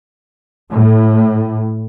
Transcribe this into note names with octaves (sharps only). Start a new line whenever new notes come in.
A2